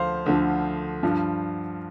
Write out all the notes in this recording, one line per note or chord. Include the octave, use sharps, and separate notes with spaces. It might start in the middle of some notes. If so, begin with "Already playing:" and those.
Already playing: D2 D3 F3 C5 F5
D2 D3 F3
G2 F3